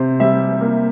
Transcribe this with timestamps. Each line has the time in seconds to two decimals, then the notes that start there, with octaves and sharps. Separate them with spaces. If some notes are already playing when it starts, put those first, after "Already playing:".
Already playing: C3 C5
0.20 G3 E5
0.61 A#3